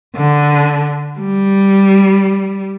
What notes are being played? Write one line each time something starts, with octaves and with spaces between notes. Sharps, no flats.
D3
G3